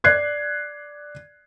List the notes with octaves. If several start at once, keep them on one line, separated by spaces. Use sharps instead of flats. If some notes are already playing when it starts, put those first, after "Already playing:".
D5 F#6 G#6 C7